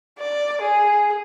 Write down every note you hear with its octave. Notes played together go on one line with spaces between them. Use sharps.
D5
G#4